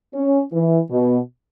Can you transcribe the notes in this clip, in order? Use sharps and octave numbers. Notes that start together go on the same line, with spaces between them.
C#4
E3
B2